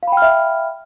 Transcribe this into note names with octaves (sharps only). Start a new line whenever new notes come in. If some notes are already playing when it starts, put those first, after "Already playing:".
E5 F5 G5 B5 F6